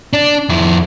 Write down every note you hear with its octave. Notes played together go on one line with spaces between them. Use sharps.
D4
F2 E4